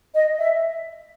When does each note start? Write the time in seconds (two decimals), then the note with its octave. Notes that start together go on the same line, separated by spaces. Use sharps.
0.14 D#5
0.38 E5